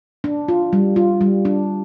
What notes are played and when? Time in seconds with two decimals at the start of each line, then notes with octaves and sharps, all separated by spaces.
0.24 D4
0.48 F4
0.73 G3
0.96 F4
1.21 G3
1.45 D4